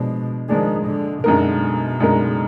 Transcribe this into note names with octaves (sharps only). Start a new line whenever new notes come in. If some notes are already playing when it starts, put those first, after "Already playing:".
Already playing: B2 F3 G#3 D4
D#3 F3 G#3 D4 G#4
D3
F#2 B2 D3 G#3 D#4 A#4
F#2 D3 G#3 D#4 A#4